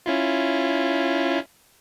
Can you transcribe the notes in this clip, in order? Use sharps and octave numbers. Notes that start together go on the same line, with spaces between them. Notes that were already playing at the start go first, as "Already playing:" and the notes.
C#4 E4 F4